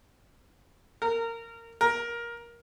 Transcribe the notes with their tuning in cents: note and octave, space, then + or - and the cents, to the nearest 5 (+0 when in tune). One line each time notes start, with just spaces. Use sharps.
A#4 -20
A#4 +15